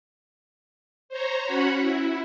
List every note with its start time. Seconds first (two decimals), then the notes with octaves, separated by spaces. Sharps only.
1.09 C5 C#5 A#5
1.43 C#4 F#4 F#5 B5
1.80 E4